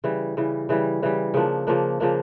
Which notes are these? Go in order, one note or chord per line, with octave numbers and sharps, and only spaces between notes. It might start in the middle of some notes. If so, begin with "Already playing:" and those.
C#3 E3 G3
C#3 E3 G3
C#3 E3 G3
C#3 E3 G3
C#3 F3 A#3 D4
C#3 F3 A#3 D4
C#3 F3 A#3 D4